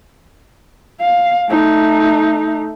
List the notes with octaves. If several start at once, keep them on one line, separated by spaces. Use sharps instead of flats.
F5
A3 D#4